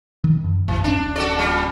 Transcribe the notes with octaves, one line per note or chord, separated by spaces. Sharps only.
D#3
F#2
A1 F#2 E3
D1 C#4 D4
F#4 A4 D5
A#2 G3